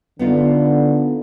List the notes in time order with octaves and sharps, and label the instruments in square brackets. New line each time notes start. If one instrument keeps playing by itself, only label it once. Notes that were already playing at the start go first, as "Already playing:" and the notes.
[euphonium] D3 [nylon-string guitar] B3 D#4 F4